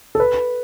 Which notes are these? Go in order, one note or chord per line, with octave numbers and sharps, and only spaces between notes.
A4
B4